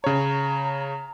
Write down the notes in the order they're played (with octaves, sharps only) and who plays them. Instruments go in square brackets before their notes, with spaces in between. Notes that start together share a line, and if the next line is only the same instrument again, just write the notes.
[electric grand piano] C#3 C#5 [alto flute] A#5